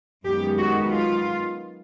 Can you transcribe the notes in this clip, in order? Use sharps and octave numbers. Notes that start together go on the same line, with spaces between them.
F#2 D#3 G#3 B3 G4
F#4
F4